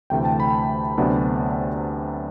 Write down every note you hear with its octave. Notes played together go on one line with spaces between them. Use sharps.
D2 C3 E3 A3 G5
A5
B5
D2 C3 F#3 B3 D4